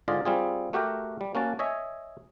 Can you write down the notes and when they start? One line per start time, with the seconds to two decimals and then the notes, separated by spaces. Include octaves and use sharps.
0.08 G#2 D3 F4 G#4 D5 D#5
0.25 G3 C4 F4 G#4
0.73 A3 F#4 G4 A#4 G5
1.21 G3
1.35 A#3 C#4 F#4 A5
1.59 C#5 D#5 E5 G#5